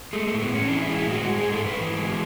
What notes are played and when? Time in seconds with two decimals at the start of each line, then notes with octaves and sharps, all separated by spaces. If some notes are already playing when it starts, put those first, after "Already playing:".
0.13 G#3 A3
0.27 A2 A3
0.41 B3
0.50 A2 C#4
0.68 E3 D4
0.82 E4
0.87 G#3
0.96 E4
1.06 A2 F#4
1.24 G#3
1.38 G#2 G#4
1.52 A4
1.61 G#2 B4
1.80 E3
1.99 G#3